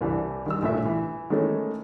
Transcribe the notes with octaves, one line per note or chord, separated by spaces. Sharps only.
C2 E3 G3 D4
D#3 G3 E6
A#1 A2 E5
E3
D#3 E3 G#3 A3 C#4